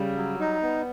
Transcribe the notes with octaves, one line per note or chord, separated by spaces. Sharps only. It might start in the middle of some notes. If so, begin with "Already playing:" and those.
Already playing: C#3 G3
F#3
D#4
B3